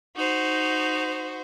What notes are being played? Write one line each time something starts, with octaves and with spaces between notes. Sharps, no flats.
D#4 F#4 C5